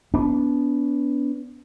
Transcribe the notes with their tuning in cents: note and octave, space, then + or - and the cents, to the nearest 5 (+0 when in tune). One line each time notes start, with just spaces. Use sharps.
B3 +0 D4 -35